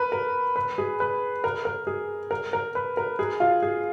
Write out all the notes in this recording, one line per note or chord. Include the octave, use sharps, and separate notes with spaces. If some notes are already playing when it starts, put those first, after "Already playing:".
Already playing: A#4 B4
A#4
B4
G#4
B4
A#4
A#4
G#4
A#4
A#4
B4
A#4
G#4
F4
G#4